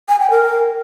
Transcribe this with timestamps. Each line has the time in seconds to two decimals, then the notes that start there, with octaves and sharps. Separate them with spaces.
0.09 G#5
0.20 G5
0.31 A#4